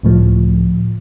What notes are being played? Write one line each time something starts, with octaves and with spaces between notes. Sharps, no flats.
C#2 A2 F3